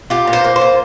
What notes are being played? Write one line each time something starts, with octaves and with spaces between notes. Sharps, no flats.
F4 G4
A#2
C5
A#3
C5
F4